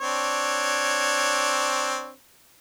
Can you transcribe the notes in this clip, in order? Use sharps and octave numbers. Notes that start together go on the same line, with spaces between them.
C4 D4 C#5